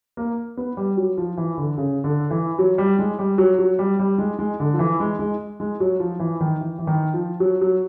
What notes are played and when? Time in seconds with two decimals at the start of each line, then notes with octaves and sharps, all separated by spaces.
0.17 A#3
0.57 B3
0.77 G3
0.97 F#3
1.17 F3
1.37 E3
1.57 D3
1.77 C#3
2.04 D3
2.31 E3
2.59 F#3
2.78 G3
2.99 G#3
3.19 G3
3.38 F#3
3.59 F#3
3.79 G3
3.99 G3
4.18 G#3
4.39 G#3
4.60 D3
4.74 F3
4.79 E3
5.00 G#3
5.19 G#3
5.60 G#3
5.80 F#3
6.00 F3
6.20 E3
6.40 D#3
6.61 E3
6.79 E3
6.87 D#3
7.14 F3
7.40 F#3
7.61 F#3